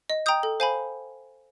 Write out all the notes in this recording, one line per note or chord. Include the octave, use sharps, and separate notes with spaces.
D#5
G5 A#5 D#6 G6
A4
C5 F5 G#5 B5